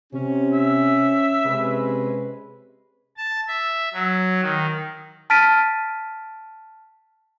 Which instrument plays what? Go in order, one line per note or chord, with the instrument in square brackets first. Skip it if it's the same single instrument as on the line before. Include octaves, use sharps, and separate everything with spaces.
[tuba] C3 [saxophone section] C#4
[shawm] E5
[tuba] C3 [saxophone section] G#3 C#4 B4
[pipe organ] A5
E5
F#3
D#3
[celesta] A5 F6 A6 B6 D7 D#7